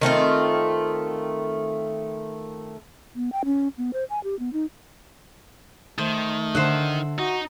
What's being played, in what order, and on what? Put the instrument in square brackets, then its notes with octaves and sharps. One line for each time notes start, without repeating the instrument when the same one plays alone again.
[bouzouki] D#3 A3 C4 F4
[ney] B3
G5
C#4
B3
C5
G#5
G4
B3
D#4
[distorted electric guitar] D#3 [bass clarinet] A3 [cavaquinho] C5
[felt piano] D3 [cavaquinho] C5 E5 F#5
[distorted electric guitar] D#4 [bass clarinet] F#4